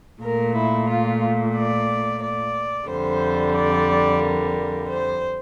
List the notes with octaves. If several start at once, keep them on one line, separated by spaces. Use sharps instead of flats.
A#2 A3 A#4
E4
F4
D5
D5
F2 D3 G3 C5
D5
A#4
C5